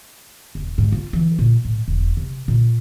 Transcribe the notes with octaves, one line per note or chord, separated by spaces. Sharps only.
E1
G#2
F4
E3
A#2
A2
E1
C3
A#2